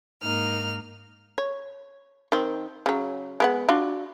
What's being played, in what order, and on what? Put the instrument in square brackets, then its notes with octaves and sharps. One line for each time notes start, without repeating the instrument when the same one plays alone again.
[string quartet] G#2 A#3 D#4 F6
[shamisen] C#5
D#3 C4
C#3 F#3
G#3 B3 F#5
D4 F4 F#4